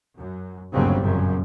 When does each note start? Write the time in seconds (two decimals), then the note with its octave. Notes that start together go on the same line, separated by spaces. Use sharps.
0.18 F#2
0.73 G1 D#2 C#3 F#3 G3 C4
1.03 F#2 A#2 C#3